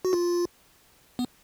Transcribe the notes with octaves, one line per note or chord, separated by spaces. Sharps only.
F#4
F4
B3